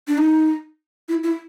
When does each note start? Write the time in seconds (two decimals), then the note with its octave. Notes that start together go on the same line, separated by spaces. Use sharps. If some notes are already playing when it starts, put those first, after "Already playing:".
0.08 D4
0.18 D#4
1.09 E4
1.24 E4